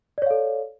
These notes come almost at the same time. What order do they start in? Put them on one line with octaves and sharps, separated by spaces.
D5 C#5 F5 A4